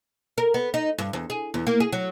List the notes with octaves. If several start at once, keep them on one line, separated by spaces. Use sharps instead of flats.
A#4
B3
D#4
G2
E2
G#4
E2
A#3
G#4
F#3